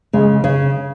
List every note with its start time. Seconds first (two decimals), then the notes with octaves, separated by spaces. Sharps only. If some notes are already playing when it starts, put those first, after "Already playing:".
0.13 C#3 G#3
0.44 C#3